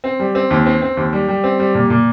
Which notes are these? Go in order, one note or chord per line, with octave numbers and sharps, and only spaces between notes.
C4
G3
C4
D#2
C4
C4
D#2
G3
G3
C4
G3
A#2
A#2